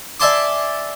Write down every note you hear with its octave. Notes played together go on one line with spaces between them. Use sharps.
D5 E5 G#5 A5 C6 D6